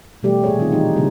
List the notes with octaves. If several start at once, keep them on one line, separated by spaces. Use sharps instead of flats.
B2 E3 G3 A3 G4 D5
A#2 G#4 C#5
D#3 C4 D#4 F4
E3 G3 D#4
C#3 F#3 G3 A#3 C4 D4